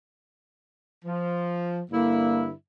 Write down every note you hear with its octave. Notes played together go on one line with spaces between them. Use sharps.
F3
G2 D3 A#3 E4